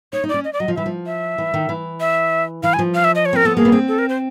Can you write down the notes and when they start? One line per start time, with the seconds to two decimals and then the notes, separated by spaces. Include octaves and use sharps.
0.13 D#4 C#5
0.24 D#4
0.29 D5
0.34 C#4
0.44 D#5
0.53 D5
0.60 F#3 D#5
0.68 F3
0.76 E3 E5
0.86 F3
1.06 E5
1.38 E3
1.54 D#3
1.69 E3
2.00 E5
2.63 E3 F5
2.74 G#5
2.79 F3
2.94 F5
3.04 E5
3.15 D#5
3.25 C#5
3.33 C4 A#4
3.45 B3 A4
3.57 A#3 G#4
3.65 B3
3.72 C4
3.88 A4
3.98 A#4
4.09 C5